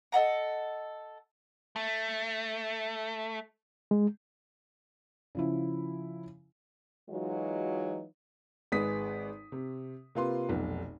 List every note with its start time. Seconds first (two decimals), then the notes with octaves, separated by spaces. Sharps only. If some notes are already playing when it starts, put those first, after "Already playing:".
0.12 A4 D#5 F#5 A#5
1.76 A3
3.91 G#3
5.35 C#3 F3 E4
7.09 E3 F#3 G#3 D#4 F4 F#4
8.72 G#1 G#3 B4 D#6 B6
9.52 C3
10.15 C3 A#3 F4 B4 C6
10.49 F1 B1